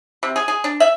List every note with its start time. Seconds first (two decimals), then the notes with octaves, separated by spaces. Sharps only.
0.23 C3
0.36 G#4
0.48 G#4
0.64 D4
0.80 E5